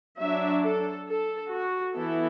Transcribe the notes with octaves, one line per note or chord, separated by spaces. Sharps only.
F#3 D4 E5
A4
A4
F#4
E3 B3 E4 A4